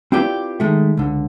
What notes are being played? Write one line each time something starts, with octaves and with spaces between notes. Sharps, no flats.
C4 E4 F4 G4 B4 D5
D#3 G#3 A3
C#2 D3